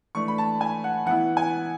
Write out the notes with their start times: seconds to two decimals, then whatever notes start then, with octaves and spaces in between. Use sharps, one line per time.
0.15 E3 A3 D4 C#6
0.28 B5
0.38 A5
0.61 G#5
0.84 F#5
1.06 E3 B3 E4 F#5
1.37 G#5